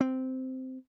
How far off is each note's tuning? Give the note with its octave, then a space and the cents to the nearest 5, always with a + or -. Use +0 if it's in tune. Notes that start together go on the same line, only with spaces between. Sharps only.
C4 -10